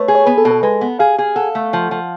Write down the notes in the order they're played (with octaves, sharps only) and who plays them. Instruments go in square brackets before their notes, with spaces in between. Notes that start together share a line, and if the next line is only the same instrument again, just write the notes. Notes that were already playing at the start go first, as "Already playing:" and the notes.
Already playing: [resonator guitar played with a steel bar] A3 [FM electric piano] B4 C#5
[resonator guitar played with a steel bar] G#4
[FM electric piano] C#5
[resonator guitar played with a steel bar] B3 [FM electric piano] B4
[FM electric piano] A4
[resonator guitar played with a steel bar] B2
[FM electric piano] A4
[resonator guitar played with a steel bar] G#3 [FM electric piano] B4
[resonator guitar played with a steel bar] B3
[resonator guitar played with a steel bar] G#4 [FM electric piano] F5
[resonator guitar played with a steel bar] G#4
[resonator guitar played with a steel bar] A4 [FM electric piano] F#5
[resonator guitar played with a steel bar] A3
F3
F3